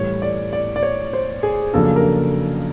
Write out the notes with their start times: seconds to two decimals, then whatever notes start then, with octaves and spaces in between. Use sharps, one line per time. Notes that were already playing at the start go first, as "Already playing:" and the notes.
Already playing: A2 E3 G3 C#5
0.22 D5
0.53 D5
0.76 D5
0.83 C#5
1.13 C5
1.43 G#4
1.73 F2 C#3 F#3 A#3 D4 A4
1.96 A#4